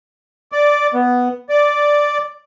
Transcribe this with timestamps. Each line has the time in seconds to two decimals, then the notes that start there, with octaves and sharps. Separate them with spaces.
0.52 D5
0.94 B3
1.49 D5